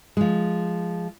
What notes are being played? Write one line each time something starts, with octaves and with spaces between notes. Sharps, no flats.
F3 G#3